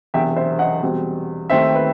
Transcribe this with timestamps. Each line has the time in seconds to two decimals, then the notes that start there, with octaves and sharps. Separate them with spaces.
0.14 E1 E2 C3 E5 G5
0.36 C5 E5
0.59 D#5 F#5
0.82 E2 B2 G3 C4
1.50 D#2 D#3 A3 C4 C5 E5
1.75 B4